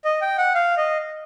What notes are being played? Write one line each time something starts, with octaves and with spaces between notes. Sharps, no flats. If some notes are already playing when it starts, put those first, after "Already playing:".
D#5
G5
F#5
F5
D#5